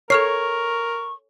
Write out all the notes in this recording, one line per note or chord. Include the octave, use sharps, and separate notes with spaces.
A4 A#4 C#5 C#6 F6 C7